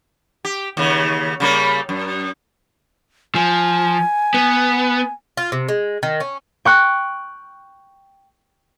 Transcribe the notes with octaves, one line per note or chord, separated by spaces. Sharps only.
G4
D#2 C#3
C#3 G3 A#3
F#2
F3 G#5
B3
F4
C3
G#3
D#3
C#4
G5 C#6 F#6